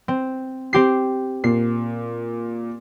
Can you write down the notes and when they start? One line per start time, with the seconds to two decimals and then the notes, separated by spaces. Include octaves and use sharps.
0.08 C4
0.73 C4 G4 C7
1.44 A#2 C7